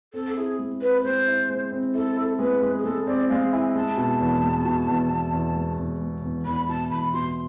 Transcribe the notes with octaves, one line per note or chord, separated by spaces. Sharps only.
C4 A4
E4 G#4
G#3
C4 B4
G#3 C5
E4
G#3
C4
E4 A4
E4
G#3 B4
G#3
G#4
G#3 A4
C4 D5
G#3 F5
E4 G#5
G#3 A5
B2
E2
G#3
B2
E2
E2
E2
G#3
E2
G#3
E2
E2 B5
B2 A5
E2 B5
B2 C6